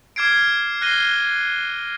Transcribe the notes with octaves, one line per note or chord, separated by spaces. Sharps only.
D6 F6 G#6 C7 D7
F6 F#6 A#6 C7 D#7 G7